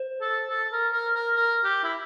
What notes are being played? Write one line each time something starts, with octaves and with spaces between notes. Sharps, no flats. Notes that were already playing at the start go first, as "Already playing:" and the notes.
Already playing: C5
A4
A4
A#4
A#4
A#4
A#4
G4
E4